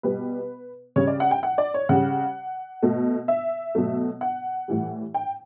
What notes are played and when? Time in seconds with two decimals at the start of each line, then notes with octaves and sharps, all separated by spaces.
0.03 B2 G3 B4
0.96 C#3 G3 C#5
1.07 D5
1.20 F#5
1.31 G5
1.43 F#5
1.58 D5
1.74 C#5
1.89 C#3 G3 F#5
2.83 B2 A3
3.28 E5
3.75 B2 F#3 A3
4.21 F#5
4.68 A2 E3 G3
5.14 G5